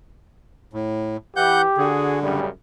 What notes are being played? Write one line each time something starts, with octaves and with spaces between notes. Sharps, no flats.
A2
E3 G4 F#5 G6
D3 F#4 G#4
F#2 A2 C#3 G3